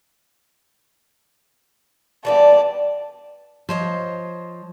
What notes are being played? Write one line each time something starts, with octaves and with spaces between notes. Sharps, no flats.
E3 G3 B3 D5 A5
F3 C5 C#5 D#5